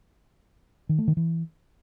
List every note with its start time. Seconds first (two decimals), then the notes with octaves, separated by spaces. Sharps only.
0.89 D#3
0.98 A3
1.08 D#3
1.17 E3